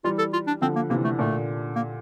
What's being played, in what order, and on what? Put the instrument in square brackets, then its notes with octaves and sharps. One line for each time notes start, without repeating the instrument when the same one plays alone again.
[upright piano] E3 G3 [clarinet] F4
[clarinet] A4
F4
D4
[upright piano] D3 F3 [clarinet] C4
[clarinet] A#3
[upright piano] C3 E3 [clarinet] A#3
[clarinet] A3
[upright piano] A#2 D3 [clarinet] A3
[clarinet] A#3